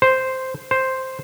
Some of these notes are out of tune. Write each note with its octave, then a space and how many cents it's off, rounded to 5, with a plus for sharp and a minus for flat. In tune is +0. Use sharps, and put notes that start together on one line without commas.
C5 -5
C5 +0